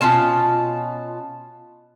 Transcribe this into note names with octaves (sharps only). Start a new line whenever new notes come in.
B2 C#4 F4 A5